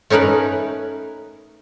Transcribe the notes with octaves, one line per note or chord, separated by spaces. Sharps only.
A3 C#4 D#4 A#4 B4